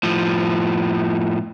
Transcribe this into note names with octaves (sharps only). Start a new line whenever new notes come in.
A2 F3